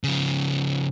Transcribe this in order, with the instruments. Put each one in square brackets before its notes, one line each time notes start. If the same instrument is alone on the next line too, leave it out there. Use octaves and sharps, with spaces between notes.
[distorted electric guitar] C#3 F3